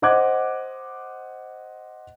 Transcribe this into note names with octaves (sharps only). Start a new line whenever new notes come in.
C5 D#5 F#5 D6 F#6 G#6